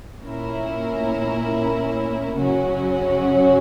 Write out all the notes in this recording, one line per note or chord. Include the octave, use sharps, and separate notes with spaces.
A#2 A#3 C#4 E4 A#4
F#2 C#3 F#3 C#4 F#4